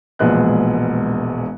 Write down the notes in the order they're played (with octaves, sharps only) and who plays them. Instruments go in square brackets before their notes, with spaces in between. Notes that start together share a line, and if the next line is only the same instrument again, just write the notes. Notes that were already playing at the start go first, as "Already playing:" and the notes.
[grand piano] E1 A#1 G#3 B3 F#6